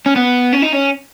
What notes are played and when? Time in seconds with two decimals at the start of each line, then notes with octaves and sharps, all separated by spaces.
0.06 C#4
0.16 B3
0.52 C#4
0.62 D#4
0.72 C#4